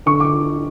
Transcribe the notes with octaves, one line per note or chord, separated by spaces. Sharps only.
D3 C#6
D6